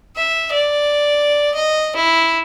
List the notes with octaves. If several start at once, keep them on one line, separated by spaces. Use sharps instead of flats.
E5
D5
D#5
E4